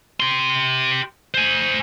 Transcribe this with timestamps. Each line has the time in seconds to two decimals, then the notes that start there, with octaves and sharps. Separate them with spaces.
0.20 G4 C6
1.34 C5 G#5